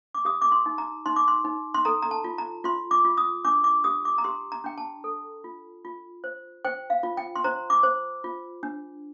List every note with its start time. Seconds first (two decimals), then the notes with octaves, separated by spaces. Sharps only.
0.15 D6
0.25 G4 D#6
0.42 D6
0.52 C6
0.66 D#4
0.78 A#5
1.06 D#4 C6
1.16 D6
1.28 C6
1.45 D#4
1.74 C6
1.85 A4 A#5
2.02 A#5
2.11 A5
2.24 F4
2.38 A#5
2.64 F4 C6
2.91 D6
3.05 F4
3.17 D#6
3.45 D4 D6
3.64 D6
3.84 G4 D#6
4.05 D6
4.18 A#5
4.24 G4 C6
4.52 A#5
4.64 D4 G5
4.78 A5
5.04 A4
5.44 F4
5.85 F4
6.24 C5
6.65 C5 G5
6.90 F5
7.03 F4
7.17 G5
7.36 C6
7.44 C5 A#5
7.70 D6
7.83 C5
8.24 F4
8.63 D4